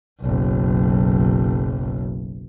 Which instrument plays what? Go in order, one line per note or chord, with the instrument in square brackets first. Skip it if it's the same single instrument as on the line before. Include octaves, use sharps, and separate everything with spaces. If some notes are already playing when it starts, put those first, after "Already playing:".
[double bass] F#1 B1